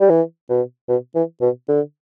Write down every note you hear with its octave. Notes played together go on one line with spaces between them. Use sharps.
G3
E3
B2
B2
E3
B2
D3